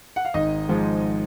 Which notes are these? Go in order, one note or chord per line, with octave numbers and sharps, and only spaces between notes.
F#5
F5
G#1 D#4 D#5
G#2 F3 G#3